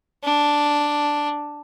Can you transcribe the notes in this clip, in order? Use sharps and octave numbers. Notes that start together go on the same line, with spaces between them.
D4